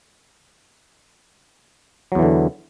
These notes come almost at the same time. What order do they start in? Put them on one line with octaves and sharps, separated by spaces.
F#3 E2 E3 D3